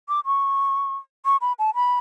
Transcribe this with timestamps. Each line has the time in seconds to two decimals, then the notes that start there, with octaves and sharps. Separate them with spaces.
0.08 D6
0.25 C#6
1.25 C#6
1.41 B5
1.59 A5
1.75 B5